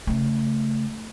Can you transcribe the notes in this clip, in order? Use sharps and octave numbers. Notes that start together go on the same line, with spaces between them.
C#3 A3